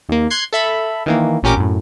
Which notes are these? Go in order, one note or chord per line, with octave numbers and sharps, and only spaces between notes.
D#2 A#3
C6 F#6 G#6 C7
A4 E5 B5
D#3 E3 A#3
A1 A#2 C#4 G4 A#4 D6
F#2 A2